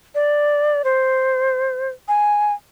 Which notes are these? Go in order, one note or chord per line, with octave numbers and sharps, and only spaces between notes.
D5
C5
G#5